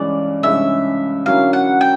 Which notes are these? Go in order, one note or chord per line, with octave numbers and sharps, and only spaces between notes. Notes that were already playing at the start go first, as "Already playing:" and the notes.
Already playing: G2 E3 G#3 C#4 D5
G2 E3 G#3 C#4 E5
D3 F#3 A#3 C#4 E4 F5
F#5
G5